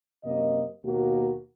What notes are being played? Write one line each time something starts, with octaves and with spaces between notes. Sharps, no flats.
F#2 C3 A#3 D#5
D#2 B2 A#3 F#4